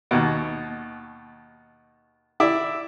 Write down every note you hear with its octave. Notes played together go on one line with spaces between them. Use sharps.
D#2 B2
E4 D5